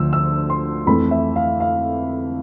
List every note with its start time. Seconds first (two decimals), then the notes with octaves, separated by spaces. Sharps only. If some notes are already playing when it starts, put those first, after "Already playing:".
Already playing: D2 D3 F3 E6
0.13 E6
0.50 C6
0.86 F2 E3 A3 B5
1.11 E5
1.36 F5
1.60 F5